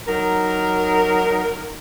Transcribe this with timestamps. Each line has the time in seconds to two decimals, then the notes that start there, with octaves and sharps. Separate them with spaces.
0.08 F#3 D#4 A#4